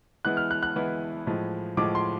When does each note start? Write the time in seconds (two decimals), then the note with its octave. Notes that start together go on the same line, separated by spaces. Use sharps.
0.25 E3 G#3 B3 E4 F#6
0.37 F6
0.51 F#6
0.63 F#6
0.76 E3 G#3 B3 E4
1.27 A2 F3 G#3
1.77 A2 F3 G#3 D6
1.95 C6